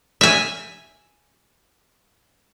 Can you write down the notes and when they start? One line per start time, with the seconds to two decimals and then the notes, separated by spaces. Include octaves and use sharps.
0.21 E5 G#5